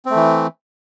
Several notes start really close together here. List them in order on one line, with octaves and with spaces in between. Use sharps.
C4 A3 E3